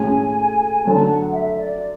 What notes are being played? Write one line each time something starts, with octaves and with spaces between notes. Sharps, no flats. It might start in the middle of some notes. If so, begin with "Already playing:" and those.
Already playing: A2 G#3 C#4 G#4 G#5
D3 F#3 A3 A5
F#5
E5
D5